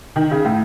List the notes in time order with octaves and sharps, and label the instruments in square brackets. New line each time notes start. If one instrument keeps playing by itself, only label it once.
[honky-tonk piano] D#3
C#3
A2